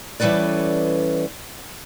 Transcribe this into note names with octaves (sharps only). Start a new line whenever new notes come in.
E3 G3 C#4 A4 B4 D5